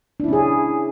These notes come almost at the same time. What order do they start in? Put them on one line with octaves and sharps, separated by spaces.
D4 E4 C#4 G#4